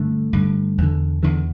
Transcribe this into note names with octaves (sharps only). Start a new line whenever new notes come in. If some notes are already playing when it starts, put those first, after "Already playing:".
Already playing: G2 D3 A3
G2 D3
E2 D3
E2 D3 E3